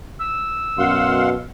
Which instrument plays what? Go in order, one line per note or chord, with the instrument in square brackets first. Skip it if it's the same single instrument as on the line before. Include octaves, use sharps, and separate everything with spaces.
[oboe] E6
[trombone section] F#2 B2 [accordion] F5 F#5 C6